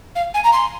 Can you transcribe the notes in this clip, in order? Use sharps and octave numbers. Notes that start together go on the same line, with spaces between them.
F5
G#5
A#5
C6